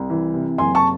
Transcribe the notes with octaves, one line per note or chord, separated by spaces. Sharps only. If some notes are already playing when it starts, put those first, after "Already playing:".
Already playing: C2
E3
C3
F#1 G#5 C6
A5 C#6